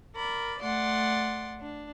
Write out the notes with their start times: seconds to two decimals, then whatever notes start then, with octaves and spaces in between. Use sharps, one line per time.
0.15 A#4 D5 B5
0.59 A3 D5 F#5 C6 A6
1.59 D4